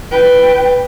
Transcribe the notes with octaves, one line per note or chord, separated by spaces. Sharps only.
B4 G5